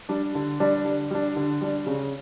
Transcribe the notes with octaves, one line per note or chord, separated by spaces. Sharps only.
G3 D4
D3
G3 D4
D3
G3 D4
D3
G3 D4
C#3